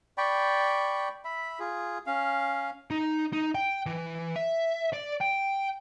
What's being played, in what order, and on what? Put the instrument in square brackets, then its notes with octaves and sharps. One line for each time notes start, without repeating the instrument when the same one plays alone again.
[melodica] D5 G5 B5 C#6
E5 B5
F4 G#4
C#4 F5
[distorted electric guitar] D#4
D#4
G5
E3
E5
D5
G5